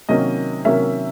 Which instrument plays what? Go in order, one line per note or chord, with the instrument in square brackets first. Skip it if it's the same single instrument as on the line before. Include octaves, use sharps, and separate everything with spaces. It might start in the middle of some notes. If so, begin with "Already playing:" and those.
[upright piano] C3 D#3 F#3 A#3 C#4 D#5
C3 D#3 F#3 A#3 C#4 E5